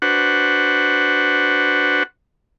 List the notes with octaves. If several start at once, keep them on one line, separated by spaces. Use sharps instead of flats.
D4 F#4 B4 C5 F#5